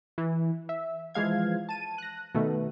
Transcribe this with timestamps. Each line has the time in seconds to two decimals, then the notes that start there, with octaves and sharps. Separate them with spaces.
0.18 E3
0.69 E5
1.14 E3 F3 G#3 F5 G#6
1.69 A5 D#7
1.98 F#6 A#6
2.35 B2 D#3 A3